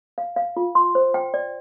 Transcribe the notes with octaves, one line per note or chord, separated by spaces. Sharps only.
F5
F5
F4
C6
C5
G5
D5